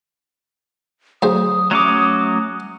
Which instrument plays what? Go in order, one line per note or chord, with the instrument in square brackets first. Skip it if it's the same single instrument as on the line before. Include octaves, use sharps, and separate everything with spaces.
[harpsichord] D2 G#4 C5 [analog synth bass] F#3 [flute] D#6
[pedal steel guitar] F#3 C#4 D6 [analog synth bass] A3